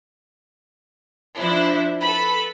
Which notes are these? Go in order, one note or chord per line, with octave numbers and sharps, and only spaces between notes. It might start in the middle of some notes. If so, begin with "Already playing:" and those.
F3 D4 E4 C5
A4 B4 B5